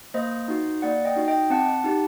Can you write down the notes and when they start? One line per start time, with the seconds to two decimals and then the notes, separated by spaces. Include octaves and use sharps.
0.14 A#3 C5 D#5
0.48 D#4 F#4
0.82 A#3 D5 F#5
1.05 D#5 G5
1.16 D#4 F#4
1.28 D#5 G5
1.50 C4 F#5 A5
1.84 D#4 G4